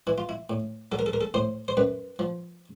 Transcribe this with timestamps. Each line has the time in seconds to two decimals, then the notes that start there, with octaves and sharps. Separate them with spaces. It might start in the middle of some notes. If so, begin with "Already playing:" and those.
0.07 E3 E4
0.18 F4
0.29 E4
0.50 A2
0.92 F#3 A4
0.99 A#4
1.06 A4
1.13 A#4
1.21 A4
1.34 A2 C5
1.68 C5
1.77 F#2 B4
2.19 F3